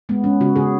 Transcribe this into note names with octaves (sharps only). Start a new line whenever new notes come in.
G#3 B3
G#3 C#4
C#3 F#4
C#3 G#4